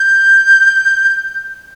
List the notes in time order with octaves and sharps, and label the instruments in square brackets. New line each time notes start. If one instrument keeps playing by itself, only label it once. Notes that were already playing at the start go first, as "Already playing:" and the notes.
Already playing: [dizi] G6